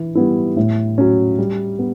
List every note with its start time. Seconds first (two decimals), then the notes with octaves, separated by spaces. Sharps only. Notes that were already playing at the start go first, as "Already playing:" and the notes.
Already playing: E3
0.15 G3 B3 E4
0.57 A2
0.98 F#3 C#4
1.39 G3
1.79 B3